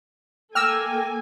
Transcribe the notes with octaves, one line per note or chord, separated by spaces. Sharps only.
A#3 A4 G5 G#5 D6 E6 F6 A#6